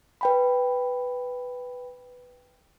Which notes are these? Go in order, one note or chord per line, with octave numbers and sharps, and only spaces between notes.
B4 G5 B5